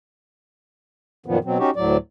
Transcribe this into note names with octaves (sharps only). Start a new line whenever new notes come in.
F#2 A#2 D#3 F3 B3
B2 F#3 C4
C#4 D#4 F#4 G4
D2 A2 F#3 D5